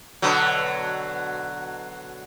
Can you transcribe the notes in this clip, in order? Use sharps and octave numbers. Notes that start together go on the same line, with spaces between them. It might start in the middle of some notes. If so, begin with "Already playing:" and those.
B2 D3 F#3